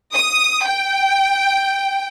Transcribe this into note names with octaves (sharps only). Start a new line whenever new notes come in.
D#6
G5